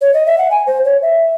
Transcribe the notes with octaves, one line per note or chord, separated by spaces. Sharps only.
C#5
D#5
E5
F#5
G#5
C5
C#5
E5